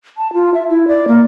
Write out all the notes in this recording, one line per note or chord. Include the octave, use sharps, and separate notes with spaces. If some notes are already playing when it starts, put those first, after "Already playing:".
A5
F4
E5
E4
D5
A#3